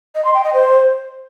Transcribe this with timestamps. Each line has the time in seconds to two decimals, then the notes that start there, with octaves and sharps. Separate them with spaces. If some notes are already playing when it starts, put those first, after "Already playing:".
0.15 D#5
0.25 C6
0.34 G5
0.44 D#5
0.53 C5